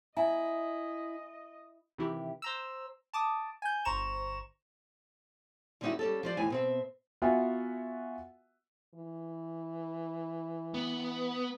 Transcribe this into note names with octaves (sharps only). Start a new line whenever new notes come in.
E4 D#5 E5 G#5 A#5
C3 D#3 E3 E4 G4
C5 A#5 E6
A5 D6 D#6
G#5 G6
G1 C5 A#5 C#6 E7
D3 G3 C#4 D#4 E4 F#4
G3 C#4 A4
F3 C5 D5
D#2 A2 E3 G#5
B2 C4 E5
B3 F4 F#4 E5 F#5 G#5
E3
B3